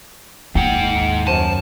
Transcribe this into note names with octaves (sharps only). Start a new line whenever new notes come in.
D#2 G#2 F#5 G5
F#2 C5 A5 D#7